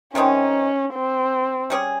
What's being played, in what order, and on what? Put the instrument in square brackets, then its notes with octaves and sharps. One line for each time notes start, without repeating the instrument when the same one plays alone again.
[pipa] C3 D#3 G#3 D#4 [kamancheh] C#4
[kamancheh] C4
[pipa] G3 C#4 G#4